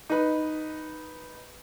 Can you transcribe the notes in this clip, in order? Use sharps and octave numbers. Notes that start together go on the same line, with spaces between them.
D#4 B4